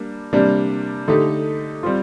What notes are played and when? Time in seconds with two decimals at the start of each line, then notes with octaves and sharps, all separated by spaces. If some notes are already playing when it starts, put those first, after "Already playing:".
Already playing: G3 A#3 D4
0.33 C3 G3 A#3 D4
1.08 D3 A3 D#4 G4
1.83 G3 C4 F4